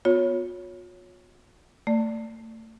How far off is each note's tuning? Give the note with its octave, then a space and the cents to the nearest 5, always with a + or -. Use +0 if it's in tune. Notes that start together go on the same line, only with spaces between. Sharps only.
B3 +0 F4 +45 C#5 +0
A3 +30 D5 +0